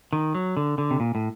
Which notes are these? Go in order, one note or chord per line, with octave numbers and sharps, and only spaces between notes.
D#3
F#3
D3
D3
C3
A#2
A2